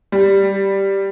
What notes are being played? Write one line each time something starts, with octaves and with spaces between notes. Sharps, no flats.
G3